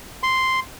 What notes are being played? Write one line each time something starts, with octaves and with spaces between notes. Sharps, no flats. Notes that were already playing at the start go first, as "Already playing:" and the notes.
C6